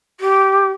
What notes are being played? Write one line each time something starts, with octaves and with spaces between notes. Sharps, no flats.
G4